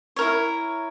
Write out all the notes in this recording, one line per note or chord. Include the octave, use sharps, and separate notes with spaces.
E4 A#4 C#5